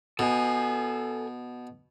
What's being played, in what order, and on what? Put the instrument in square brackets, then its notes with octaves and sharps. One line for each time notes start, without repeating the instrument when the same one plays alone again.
[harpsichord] B2 [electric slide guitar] A4 G#5